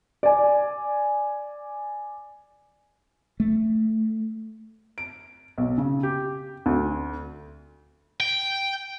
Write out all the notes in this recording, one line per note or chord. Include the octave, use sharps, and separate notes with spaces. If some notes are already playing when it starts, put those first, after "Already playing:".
D5 G#5
A3
D7
B1
C#3
G4
D2
G5